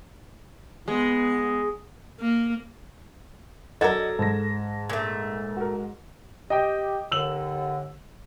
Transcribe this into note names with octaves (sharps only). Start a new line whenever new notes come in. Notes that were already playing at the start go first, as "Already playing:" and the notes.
G#3 B3
A#3
F#3 A4 A#4 D5 D#5 F#5 G#6
G#2 A5 A#6
A#2 A3
F#4 A#4
G4 D#5 G5
D#2 D3 E6 F#7